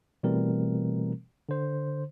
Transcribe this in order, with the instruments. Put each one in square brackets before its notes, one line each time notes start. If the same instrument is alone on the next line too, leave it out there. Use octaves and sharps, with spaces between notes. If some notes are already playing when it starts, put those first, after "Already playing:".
[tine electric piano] B2 E3 G3 A3 C4 A#4
D3 C5